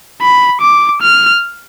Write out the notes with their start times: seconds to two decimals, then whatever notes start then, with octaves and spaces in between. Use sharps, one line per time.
0.22 B5
0.62 D6
1.02 F6